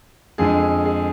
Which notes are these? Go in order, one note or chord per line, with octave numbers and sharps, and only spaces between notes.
F2 D3 G#3 G#4
G#4